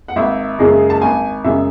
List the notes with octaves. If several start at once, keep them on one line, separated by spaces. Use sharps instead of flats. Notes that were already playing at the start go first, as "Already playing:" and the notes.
F#5
G#1 E5
F#2 C#3 G#3
A5
G#1 G#5
F#2 C#3 G#3 E5